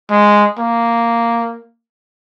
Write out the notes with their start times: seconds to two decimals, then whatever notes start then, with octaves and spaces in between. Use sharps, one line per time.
0.10 G#3
0.59 A#3